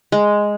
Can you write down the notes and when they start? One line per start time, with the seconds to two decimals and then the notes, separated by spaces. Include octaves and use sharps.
0.12 G#3